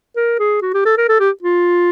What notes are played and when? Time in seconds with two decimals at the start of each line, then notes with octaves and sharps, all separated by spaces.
0.16 A#4
0.39 G#4
0.62 F#4
0.74 G4
0.85 A4
0.97 A#4
1.09 A4
1.20 G4
1.43 F4